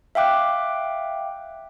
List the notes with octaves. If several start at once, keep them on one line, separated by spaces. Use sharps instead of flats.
E5 F5 G5 D6 F#6